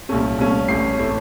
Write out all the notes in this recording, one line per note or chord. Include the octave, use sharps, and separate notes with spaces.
C2 A#2 A3 C#4
C2 A#2 A3 C#4
A1 A2 A3 C#4 C7
A2 A3 C#4